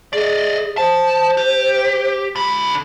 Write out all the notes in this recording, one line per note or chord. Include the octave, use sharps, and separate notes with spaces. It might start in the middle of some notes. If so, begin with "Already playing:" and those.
G#4 D5 D#5
C5 A5
G4
D3 B5